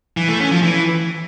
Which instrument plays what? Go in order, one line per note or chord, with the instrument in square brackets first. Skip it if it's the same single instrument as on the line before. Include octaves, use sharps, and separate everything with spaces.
[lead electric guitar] E3
A3
C#4
F3
E3